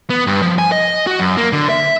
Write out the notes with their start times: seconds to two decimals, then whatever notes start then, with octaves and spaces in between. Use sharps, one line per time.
0.10 B3
0.27 G2
0.42 F3
0.59 G#5
0.72 D#5
1.07 F#4
1.19 F#2
1.37 A#3
1.52 D3
1.69 E5